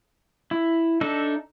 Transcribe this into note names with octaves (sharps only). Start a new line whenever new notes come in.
E4
D4 D#4 A4 E5